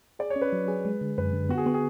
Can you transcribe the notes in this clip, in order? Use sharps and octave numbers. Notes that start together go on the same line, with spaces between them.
G#4 D5
C#5
C#4
B4
F#3
G#4
G#3
D3
F#2 B4
D3
B3 F#4
G#4
B3 F#4
G#4